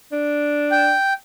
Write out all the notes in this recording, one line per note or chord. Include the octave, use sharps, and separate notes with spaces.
D4
G5